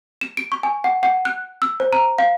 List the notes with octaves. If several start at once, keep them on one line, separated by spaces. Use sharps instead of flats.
E7
D7
C#6
G#5
F#5
F#5
F#6
E6
C5
A#5
F5